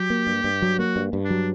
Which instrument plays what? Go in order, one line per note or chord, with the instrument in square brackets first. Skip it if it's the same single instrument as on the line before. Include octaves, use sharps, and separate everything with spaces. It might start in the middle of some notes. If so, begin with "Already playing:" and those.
Already playing: [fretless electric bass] F#3 [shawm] G4
[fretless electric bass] A#3
G2
G2
F#3
[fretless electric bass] A#3 [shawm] F#4
[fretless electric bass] G2
G2
[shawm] D4
[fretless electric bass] F#3